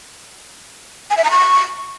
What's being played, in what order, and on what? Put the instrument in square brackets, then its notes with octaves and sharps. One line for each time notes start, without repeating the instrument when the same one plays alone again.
[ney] G#5
E5
A#5
C#6